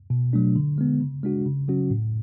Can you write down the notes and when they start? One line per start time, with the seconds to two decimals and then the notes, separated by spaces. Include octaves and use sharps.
0.10 B2
0.33 F#3 A3 D4
0.56 D3
0.78 G#3 B3
1.00 C#3
1.23 G#3 D4 F#4
1.46 C#3
1.68 F#3 C#4 F#4
1.90 A2